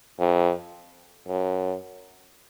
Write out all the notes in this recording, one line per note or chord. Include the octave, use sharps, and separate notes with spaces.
F2
F#2